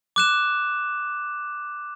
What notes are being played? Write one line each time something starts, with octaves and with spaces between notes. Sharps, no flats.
D6 F#6 E7